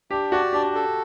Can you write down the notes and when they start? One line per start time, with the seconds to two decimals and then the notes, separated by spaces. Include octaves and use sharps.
0.11 D4 G4
0.32 F#4 D5
0.53 D4 G4
0.75 A4